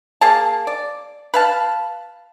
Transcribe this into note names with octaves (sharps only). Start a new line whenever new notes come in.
A#3 G#4 A5
D5
B4 F5 A5